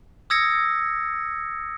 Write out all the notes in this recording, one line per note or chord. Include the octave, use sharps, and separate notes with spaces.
D#6 E6 G#6 A#6 C#7